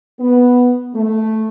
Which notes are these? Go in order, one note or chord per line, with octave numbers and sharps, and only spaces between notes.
B3
A3